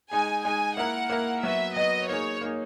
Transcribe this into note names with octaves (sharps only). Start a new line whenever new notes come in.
G#3 D#4 G#4 G#5
G#3 D#4 G#4 G#5
A#3 E4 A#4 F#5
A#3 E4 A#4
F#3 B3 F#4 B4 E5
F#3 B3 F#4 B4 D#5
A#3 D#4 G#4 C#5
A#3 D#4 G#4